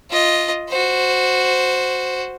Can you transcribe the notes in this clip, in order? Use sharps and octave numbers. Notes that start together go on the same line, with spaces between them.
F4 D#5
F#4 C5